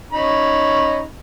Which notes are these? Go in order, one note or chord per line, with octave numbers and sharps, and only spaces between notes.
C#4 D#4 B5